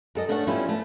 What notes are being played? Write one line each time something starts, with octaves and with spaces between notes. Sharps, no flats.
F#2 A4 D#5
A3 C#4 D4 A4 C5 F#5
F3 G3 B3 C#4 E4
A3